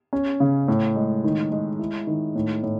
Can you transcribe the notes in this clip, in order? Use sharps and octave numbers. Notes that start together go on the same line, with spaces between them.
C#4
C#3
A2
G#3
D#3
G#3
E4
D#3
A2
A2